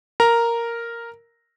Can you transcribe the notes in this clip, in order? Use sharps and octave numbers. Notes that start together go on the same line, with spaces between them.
A#4 A#5